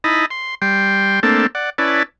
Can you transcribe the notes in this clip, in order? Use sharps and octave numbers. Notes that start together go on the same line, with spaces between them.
D#4 E4 D#5 A5 B5
C6
G3 G5 C6
A3 A#3 C4 D4 A4
D5 F#5
C#4 E4 B4 D5 A5